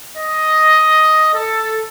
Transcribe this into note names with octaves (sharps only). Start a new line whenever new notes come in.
D#5
A4